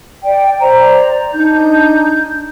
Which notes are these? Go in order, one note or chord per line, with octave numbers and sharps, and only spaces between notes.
D5 G5
C5 D5 A#5
D4 D#4 G6